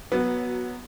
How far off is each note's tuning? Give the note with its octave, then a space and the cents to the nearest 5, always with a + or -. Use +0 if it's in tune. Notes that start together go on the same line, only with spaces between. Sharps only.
F#3 +0 B3 -10